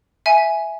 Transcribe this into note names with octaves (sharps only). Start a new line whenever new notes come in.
E5 G#5